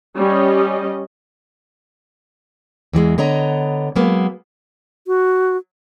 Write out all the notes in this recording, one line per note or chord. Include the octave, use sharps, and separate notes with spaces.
G3 C#4 D#5
E2 E3 F#3 G#3
D3 B3 C#5 D#5 A#5
F#3 G#3 A#3 B3
F#4